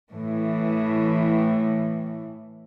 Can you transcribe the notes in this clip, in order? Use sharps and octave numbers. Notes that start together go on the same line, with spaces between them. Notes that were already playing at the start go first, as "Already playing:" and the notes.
A2 E3